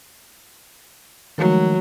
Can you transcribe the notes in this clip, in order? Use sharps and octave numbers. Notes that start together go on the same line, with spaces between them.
D#3 F3 F#3 G#3 A3